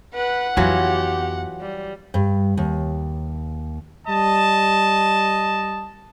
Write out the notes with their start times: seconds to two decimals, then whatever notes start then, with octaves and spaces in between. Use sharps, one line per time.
0.15 B4 F#5
0.57 F2 E3 F#3 B3 F4 G4
1.61 G3
2.14 G2
2.57 D#2
4.08 G3 D#5 A5